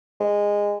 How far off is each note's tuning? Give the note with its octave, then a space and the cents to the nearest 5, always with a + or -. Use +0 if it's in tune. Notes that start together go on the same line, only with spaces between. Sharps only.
G#3 -15